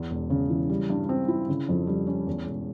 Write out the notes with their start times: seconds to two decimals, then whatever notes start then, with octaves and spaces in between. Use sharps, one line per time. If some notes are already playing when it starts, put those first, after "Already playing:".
Already playing: E2
0.11 E1
0.30 C#3
0.50 E3
0.70 G3
0.90 G2
1.09 C4
1.28 E4
1.49 C#3
1.69 F2
1.87 G3
2.07 C#4
2.27 E2
2.47 E1